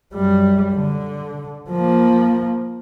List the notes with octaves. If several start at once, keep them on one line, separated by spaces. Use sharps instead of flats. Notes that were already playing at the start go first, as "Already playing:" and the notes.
F#2 G3
D3
F3 A#3